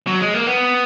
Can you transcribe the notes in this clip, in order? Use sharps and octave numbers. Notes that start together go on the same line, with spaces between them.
F#3
G#3
A#3
B3